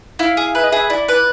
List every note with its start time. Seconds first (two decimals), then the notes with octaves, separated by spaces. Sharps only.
0.19 E4 F5
0.37 G#4
0.54 B4 E5
0.64 D#5
0.72 G#4 E5
0.90 E4 D5
1.08 B4